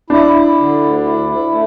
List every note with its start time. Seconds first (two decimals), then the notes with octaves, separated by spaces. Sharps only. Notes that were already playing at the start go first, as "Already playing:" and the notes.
0.10 D4 E4
0.33 E4
0.58 D3
0.80 D2
1.04 E4
1.29 E4
1.51 A3